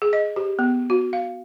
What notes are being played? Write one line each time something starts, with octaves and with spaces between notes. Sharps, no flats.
G#4
D#5
G4
B3
F#4
F5